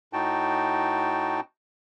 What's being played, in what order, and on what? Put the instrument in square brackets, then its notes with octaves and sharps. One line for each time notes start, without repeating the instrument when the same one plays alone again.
[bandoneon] A2 D#4 F#4 G5 A5